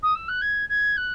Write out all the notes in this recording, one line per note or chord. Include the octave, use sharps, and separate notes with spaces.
D#6
E6
F#6
G#6
G#6
F#6